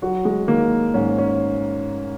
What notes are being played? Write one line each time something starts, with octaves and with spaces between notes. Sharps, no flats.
F#3 F#4
G#3
D#3 A#3
G#2 C#4
C#4